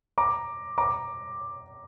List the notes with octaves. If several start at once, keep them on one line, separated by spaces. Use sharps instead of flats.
A#5 D6
A#5 D6